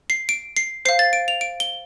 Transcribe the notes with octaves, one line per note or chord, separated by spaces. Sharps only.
C7
D7
C7
C5 F5 C7
A6
D7
F7
D7
G7